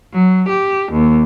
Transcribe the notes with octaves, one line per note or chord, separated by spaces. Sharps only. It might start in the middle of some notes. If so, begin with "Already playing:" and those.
F#3
G4
D#2